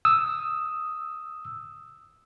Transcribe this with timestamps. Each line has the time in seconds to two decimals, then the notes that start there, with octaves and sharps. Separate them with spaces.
0.05 D#6 E6